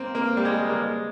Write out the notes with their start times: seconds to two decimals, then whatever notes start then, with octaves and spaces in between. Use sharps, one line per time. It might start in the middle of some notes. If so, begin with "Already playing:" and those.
Already playing: A#3 C4
0.15 A#3
0.37 G3
0.45 G#3
0.69 A#3
0.76 G#3